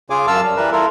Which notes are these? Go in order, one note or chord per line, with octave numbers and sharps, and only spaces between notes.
C#3 F4 G#4 G#5 D6
F#2 F5 A5 E6
G3
E3 G3 A#4 B4
E4 F4 A4 A#4